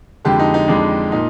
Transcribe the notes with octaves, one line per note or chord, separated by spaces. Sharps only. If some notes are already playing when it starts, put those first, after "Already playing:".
F2 D3 G#3 G4
D#4
D#4
F2 D3 G#3 D4
A#2 D#4